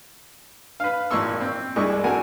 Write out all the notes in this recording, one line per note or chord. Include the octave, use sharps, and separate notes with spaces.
B4 F5
G#1 A#2 E4 C6 C#6 E6
C4
C2 G#3 D4 E4 C#6
G#1 C4 F#4 A4 A#4 G#5